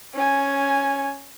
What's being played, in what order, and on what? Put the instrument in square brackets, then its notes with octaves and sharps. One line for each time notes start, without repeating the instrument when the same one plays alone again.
[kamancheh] C#4 G#5